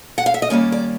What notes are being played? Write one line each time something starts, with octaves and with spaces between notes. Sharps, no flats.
F#5
F5
E5
D#5
D#3 G3 A#3 C#4 D5
D5